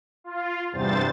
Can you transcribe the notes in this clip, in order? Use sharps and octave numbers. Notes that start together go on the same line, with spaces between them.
F4
E2 G2 C3 C5 A6